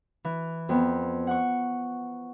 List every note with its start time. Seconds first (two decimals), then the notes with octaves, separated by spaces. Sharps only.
0.25 E3
0.69 F2 B3
1.27 F#5 C#6